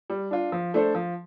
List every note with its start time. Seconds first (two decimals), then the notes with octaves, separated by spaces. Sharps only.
0.10 G3
0.31 D4 F4
0.52 F3
0.74 A3 D4 A4 C5
0.95 F3